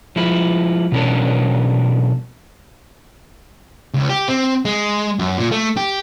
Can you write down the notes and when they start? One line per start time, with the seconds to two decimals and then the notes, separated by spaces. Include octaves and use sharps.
0.16 F3 G#3 E4
0.92 B2 E3 F#3 C#4 D4 A#4
3.94 C#2
4.10 G4
4.28 C4
4.65 G#3
5.19 F#2
5.38 A#2
5.52 A3
5.77 G4